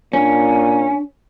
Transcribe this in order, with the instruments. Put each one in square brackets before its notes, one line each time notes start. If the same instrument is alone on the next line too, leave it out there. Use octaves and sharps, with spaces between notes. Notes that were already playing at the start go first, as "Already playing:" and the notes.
[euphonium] A#2 [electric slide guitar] C#4 [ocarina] D4